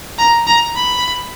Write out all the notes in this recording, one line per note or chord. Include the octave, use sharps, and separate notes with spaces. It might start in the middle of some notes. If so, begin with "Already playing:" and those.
A#5
A#5
B5